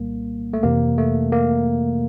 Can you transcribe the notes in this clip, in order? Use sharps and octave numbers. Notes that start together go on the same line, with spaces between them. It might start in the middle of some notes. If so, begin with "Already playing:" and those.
Already playing: C2 A#2 G3 A#3
A3
F2 C3 E3 A#3
A3
A#3